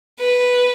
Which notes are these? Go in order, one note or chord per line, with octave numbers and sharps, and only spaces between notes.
B4